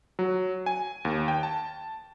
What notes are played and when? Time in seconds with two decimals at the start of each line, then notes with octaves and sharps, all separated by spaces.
0.19 F#3
0.66 G#5
1.05 D#2
1.28 G5
1.43 A5